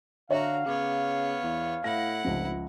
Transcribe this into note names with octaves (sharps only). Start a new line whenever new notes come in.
D3 F#4 C#5 E5 F5 A#5
C#3 B3 C#5 D6
E2
A2 E4 F#5 A#6
F1 C#2 F3